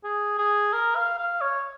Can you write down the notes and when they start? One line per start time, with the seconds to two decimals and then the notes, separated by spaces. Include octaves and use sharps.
0.04 G#4
0.38 G#4
0.73 A#4
0.96 F5
1.18 F5
1.41 C#5